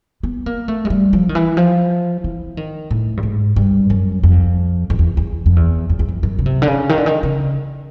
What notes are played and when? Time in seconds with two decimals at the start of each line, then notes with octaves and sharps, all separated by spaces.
0.23 B3
0.46 A#3
0.68 A3
0.85 G#3
0.90 G3
1.13 F3
1.29 D#3
1.35 E3
1.57 F3
2.24 E3
2.57 D#3
2.91 A2
3.17 G2
3.23 G#2
3.56 G2
3.90 F#2
4.23 F2
4.90 F2
4.99 E2
5.17 E2
5.46 F2
5.56 E2
5.89 F2
5.99 E2
6.09 F2
6.23 F#2
6.39 C#3
6.46 C3
6.62 D3
6.68 C#3
6.89 D#3
6.98 D3
7.06 D#3
7.23 C#3